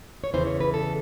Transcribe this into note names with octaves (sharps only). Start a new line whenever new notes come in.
C#5
E2 C#3 E3 C5
C#5
B4
A4